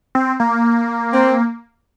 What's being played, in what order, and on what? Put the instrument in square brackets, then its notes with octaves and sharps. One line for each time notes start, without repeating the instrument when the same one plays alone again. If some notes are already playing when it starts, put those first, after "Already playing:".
[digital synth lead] C4
A#3
[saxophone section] C4